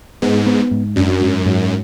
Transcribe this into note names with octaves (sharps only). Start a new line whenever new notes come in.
G#2 B3
B3
G#2
F#2 D4
G#2
G#2